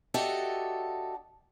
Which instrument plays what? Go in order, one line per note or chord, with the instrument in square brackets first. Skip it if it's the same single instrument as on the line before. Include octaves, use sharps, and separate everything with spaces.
[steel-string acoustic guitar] D4 F#4 G4 A4 D#5 E5